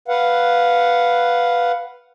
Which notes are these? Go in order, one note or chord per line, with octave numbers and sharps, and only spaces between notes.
B4 F5 F#5